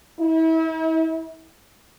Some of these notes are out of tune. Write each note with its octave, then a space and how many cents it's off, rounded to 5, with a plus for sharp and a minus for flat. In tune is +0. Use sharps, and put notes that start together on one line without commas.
E4 -35